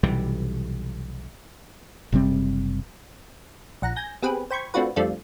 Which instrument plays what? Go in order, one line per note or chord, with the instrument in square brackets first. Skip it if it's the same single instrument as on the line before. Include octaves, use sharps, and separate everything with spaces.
[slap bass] B1 C3 E3 G3
[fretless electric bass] F#1 C3 G3 C4
[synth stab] A#1 F#5 A#5
G#5 G6 A#6
B3 C4 G4 G#4 B4
C5 G5 B5 C#6 G#6
A3 C4 D4 F4 F#4 B4
F2 G3 A3 C4 D4 F4